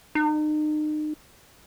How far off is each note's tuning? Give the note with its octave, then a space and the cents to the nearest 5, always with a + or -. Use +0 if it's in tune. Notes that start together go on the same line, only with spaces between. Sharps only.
D#4 -35